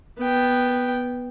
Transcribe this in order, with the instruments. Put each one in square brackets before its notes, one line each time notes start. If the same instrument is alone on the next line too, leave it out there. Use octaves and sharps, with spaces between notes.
[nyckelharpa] B3 G5